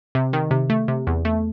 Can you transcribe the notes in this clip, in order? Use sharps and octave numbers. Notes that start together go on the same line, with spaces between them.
C3
D#3
C3
A3
C3
E2
A3